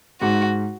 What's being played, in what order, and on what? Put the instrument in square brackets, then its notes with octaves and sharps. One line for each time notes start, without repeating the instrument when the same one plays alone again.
[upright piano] G#2 [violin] F#4